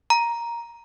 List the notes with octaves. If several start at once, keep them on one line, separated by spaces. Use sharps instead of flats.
A#5